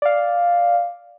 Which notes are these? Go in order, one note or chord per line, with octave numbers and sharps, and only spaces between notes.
D5 F5